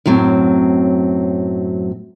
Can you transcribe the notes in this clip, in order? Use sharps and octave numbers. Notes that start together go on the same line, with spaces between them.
F#2 A2 F#3 C4